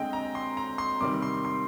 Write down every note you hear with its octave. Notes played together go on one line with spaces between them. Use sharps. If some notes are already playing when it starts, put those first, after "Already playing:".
Already playing: D3 G#3 C4 D#5 G5
A#5
C6
A#5
C6
C3 D#3 G3 C4 D6
C6
C6